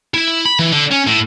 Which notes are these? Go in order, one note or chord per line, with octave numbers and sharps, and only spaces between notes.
E4
B5
E3
D3
C#4
A2